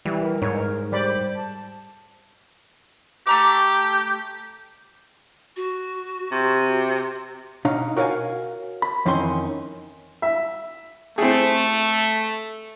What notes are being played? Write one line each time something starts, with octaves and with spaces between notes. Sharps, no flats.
E3 G3
A#4
G#2 D#4 C#5
G3 C5 D5 B5
A5
A3 G4 A#5 D6
F#4
C3
B2 D4 D#4 C#5 F5
F#4 A#4 C#5 D5 F5 G#5
B5
F2 D#3 E3 C4 C#4 C6
E5
A3 C4 G#4